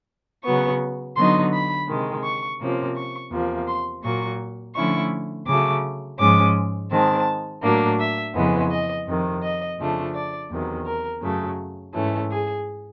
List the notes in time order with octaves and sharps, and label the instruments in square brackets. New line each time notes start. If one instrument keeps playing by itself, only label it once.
[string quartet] C#3 F#3 B3 C#6
D3 F#3 B3 D#4 C6
B5
C3 D#3 G#3
C#6
C3 F3 A#3 C#4
C#6
E2 C3 F3 A#3
C6
A#2 F#3 A#3 C#6
D3 F3 A3 C#4 E4 C#6
C#3 F#3 A3 D6
G#2 F3 G#3 C#4 D6
D#3 G#3 C4 A5
A2 F#3 A#3 D4
E5
F2 C#3 E3 G#3 B3
D#5
F2 C3 D#3
D#5
F2 C#3 F3 A3 D4
D5
E2 C3 D#3 F#3
A#4
F#2 C#3 F#3 A3
G#2 E3 A3 C#4
G#4